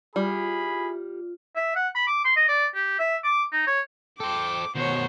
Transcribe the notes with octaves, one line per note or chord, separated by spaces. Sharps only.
G3 E4 F4 G#4 B5
E5
F#5
B5
D6
C6
D#5
D5
G4
E5
D6
D#4
C#5
A4 C5 G5 D6
B2 D#3 C5 C#5 F#5